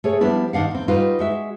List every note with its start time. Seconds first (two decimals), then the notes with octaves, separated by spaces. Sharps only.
0.04 A3 G#4 C#5
0.21 F3 G3 B3 D4 E4
0.53 D#3 D4 F5 F#5
0.71 E2 C4
0.88 G3 D#4 F4 F#4 B4
1.19 G#3 F#4 E5